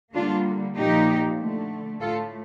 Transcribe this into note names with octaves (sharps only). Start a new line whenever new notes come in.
D3 G3 A#3 D4 F4
A#2 F3 A#3 D#4 G4
D3 A3
A2 A3 F4 A4